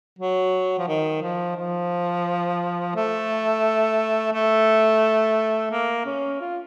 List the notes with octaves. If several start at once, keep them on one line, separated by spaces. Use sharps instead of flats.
F#3
F3
D#3
F3
F3
A3
A3
A#3
C#4
F4